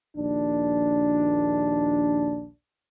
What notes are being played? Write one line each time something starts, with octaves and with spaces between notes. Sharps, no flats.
A#1 D#2 D4